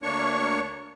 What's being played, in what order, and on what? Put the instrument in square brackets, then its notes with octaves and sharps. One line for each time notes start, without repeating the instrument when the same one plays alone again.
[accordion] D2 A#3 D4 C#5 C#6